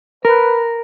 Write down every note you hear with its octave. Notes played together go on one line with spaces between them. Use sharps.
A#4 B4